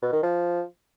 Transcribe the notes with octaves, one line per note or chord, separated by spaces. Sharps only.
B2
D#3
F3